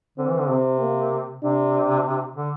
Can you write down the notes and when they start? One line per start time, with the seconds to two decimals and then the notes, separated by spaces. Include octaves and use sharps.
0.18 D3 C4
0.28 E3
0.39 D3
0.49 C3 C4
0.80 A#3
1.42 C3 D4
2.36 D3